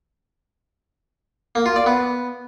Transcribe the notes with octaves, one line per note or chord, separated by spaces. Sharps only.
A#3
F4
D5
B3